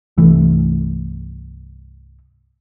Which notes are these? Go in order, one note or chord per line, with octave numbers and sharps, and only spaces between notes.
C2 G2 E3 A3